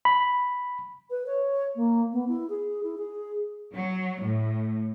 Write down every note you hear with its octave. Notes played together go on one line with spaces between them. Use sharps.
B5
B4
C#5
A#3
B3
E4
G#4
E4
G#4
F#3
A2